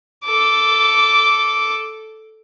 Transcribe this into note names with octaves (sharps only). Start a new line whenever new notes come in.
A4 D6